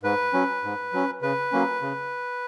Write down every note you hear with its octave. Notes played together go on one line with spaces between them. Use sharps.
G#2 B4
F#3 C#4
G#2
F#3 C#4
C#3 B4
F#3 A#3 C#4
C#3